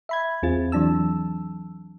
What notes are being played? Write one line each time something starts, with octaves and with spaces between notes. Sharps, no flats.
E5 B5 G#6
E2 C4 F4 G#4 A6
E3 F#3 D4 A5 E6